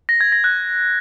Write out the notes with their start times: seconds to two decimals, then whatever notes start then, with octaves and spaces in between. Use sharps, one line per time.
0.09 A#6
0.21 G#6
0.32 A#6
0.44 F#6